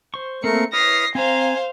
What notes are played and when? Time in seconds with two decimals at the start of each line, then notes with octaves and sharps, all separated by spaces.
0.14 C5 C#6
0.44 A3 A#3 C4 A#4 C#7
0.73 E4 B4 C#5 D#6 F6 A#6 C7
1.15 C4 C5 F5 G#5 A#5